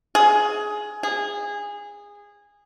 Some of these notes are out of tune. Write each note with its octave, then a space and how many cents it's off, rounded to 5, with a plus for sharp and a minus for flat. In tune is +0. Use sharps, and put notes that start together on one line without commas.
G#4 +15
G#4 -20